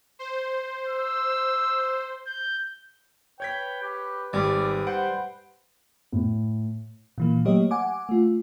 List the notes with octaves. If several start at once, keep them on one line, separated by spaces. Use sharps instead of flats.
C5
E6
G6
B4 C#5 G5 G#6 B6
G4
G#1 G3 D5
C5 F#5 D7
A2
A#2 E3 A#3
F#3 A3 A#3 G4 C#5 D#5
F#5 G#5 D6
A3 F4